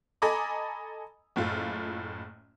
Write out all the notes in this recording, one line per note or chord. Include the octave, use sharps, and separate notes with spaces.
A4 D#5 G#5 A#5 B5 D6
F#1 A2 F4